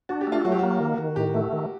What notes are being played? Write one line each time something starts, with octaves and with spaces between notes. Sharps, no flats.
D4 F#4
G4
A3 F4
F#3 F#4
G4
A#3 F#4
D#3
D#3
A2 G4
A3
D#3